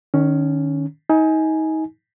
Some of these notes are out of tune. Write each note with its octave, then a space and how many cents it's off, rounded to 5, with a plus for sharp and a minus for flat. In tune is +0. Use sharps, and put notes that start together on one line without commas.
D#3 -25 C#4 +10
D#4 +30 G#5 +10